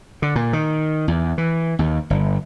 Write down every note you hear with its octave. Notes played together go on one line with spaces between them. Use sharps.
D3
A#2
D#3
E2
E3
D#2
G1